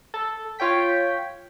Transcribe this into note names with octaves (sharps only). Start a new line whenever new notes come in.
A4
F4 C#5 G5 B6